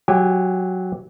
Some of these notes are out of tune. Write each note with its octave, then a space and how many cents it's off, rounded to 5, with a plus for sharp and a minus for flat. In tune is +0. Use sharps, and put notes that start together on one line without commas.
F#3 +0 G4 +0 G#5 -25